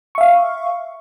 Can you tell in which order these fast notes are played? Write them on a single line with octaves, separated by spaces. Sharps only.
C#6 E5 F5